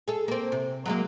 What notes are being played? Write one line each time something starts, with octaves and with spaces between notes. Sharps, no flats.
G#4 A4
A#3 C4
C3
F#3 G#3 A#3